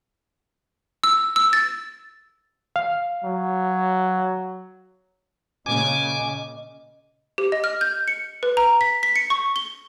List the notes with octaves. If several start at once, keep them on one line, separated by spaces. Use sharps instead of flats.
E6
E6
A6
F5
F#3
A#2 C#3 D#5 G#5 D6
G4
D#5
F6
G6
C#7
B4
A#5
B6
B6
C#7
C#6
G7